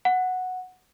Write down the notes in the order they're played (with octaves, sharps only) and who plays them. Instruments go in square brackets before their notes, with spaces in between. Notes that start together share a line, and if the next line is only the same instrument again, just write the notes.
[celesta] F#5